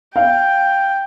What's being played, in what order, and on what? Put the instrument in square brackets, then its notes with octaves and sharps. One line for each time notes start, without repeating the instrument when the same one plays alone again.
[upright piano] F5 [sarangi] G5